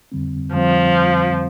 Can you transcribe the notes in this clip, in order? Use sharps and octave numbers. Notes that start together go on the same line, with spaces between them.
F2 D3 G3 C4
F2 D3 F3 G3 C4